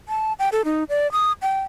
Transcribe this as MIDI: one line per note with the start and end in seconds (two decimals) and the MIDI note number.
0.08 0.33 81
0.39 0.49 79
0.52 0.62 69
0.65 0.84 63
0.89 1.10 74
1.12 1.32 87
1.42 1.61 79